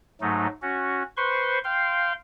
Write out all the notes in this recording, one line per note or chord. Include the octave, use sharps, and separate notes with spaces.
G#2 F#3 A3 D#4
C#4 F#4
B4 C5 C6 C#6
F5 G5 C6